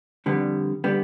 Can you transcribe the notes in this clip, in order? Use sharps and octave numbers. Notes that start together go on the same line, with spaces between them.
F2 D3 G3 B3
D3 G3 B3